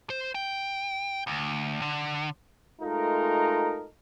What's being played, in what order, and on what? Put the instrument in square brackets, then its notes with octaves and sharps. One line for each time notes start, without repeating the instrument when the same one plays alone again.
[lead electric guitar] C5
G5
D2
D3
[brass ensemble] G#3 A3 D#4 F4 A4 A#4